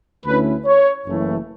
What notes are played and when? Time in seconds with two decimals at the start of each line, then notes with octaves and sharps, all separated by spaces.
0.24 D2 D3 A3 C#4 E4 B4
0.65 C#5
1.06 F#1 F#2 C#3 E3 A3